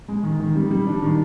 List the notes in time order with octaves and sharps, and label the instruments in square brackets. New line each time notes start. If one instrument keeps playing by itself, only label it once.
[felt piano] G#3
D#3
D#3
G3
G3
D4
D#3